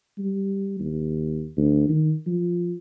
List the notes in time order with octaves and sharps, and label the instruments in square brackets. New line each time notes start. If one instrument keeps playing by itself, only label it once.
[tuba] G3
D#2
D2
D#3
F3